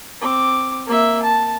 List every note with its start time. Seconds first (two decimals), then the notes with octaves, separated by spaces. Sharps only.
0.21 C4 D6
0.87 A#3 E5
1.23 A5